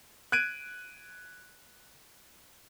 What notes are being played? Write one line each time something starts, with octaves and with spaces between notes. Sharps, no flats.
F#6 G#6 D7 D#7